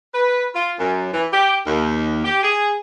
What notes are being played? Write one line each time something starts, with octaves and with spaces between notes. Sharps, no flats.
B4
F4
F#2
E3
G4
D#2
G4
G#4